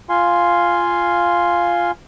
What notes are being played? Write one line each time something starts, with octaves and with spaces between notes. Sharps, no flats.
F4 F5 G#5 C6